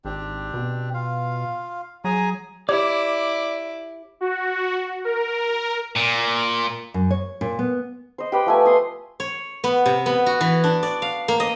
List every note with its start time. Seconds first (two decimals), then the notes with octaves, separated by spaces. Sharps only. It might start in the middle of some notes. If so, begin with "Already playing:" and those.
0.05 G#1 C4 D4 G4
0.54 B2
0.94 F4 F5
2.05 F#3 G#4 G#5 A#5
2.69 E4 G4 C#5 D5 D6 G#6
4.21 F#4
5.05 A#4
5.96 A#2
6.94 F#2
7.11 C#5
7.41 A#2
7.59 B3
8.18 C5 D#5
8.32 G4 B4 G5
8.46 F3 A3 G#5
8.65 C6 D#6
9.20 C#5
9.64 B3
9.86 C3
10.06 B3
10.26 F#4
10.41 E3
10.64 D4
10.83 D5
11.02 F5
11.28 A#3
11.40 D#5